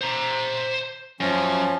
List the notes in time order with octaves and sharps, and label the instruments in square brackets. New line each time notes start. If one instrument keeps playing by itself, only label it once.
[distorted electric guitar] C5 A#5
[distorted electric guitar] F#2 [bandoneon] F3 C#4